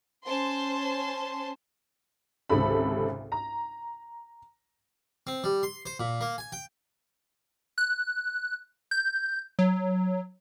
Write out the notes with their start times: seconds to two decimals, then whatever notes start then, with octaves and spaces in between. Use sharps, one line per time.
0.24 C#4 C5 A5 C6
2.49 G#1 C#2 C3 A4 B5
3.32 A#5
5.27 C4
5.44 G3
5.63 C6
5.86 C5
6.00 A#2
6.21 A#3
6.38 G#5
6.52 G5
7.78 F#6
8.91 G6
9.59 F#3